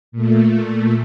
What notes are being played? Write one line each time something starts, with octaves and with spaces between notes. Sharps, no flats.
A#2 A3